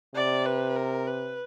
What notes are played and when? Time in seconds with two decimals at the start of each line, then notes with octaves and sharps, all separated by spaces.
0.15 C3 D5
0.45 B4
0.76 A#4
1.07 B4